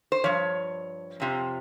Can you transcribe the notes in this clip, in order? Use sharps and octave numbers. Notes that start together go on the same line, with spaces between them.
C5
G2 F3 C#5
F2 C3 F3